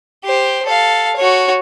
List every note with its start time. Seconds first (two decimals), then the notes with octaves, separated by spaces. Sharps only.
0.24 G4 C5
0.66 A4 F5
1.17 F#4 C#5